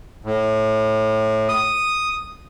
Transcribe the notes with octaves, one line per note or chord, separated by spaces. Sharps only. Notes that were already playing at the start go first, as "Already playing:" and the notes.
A2
D#6